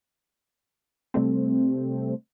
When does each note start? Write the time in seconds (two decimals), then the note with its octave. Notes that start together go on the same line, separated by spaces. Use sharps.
1.14 C3 G3 A3 C4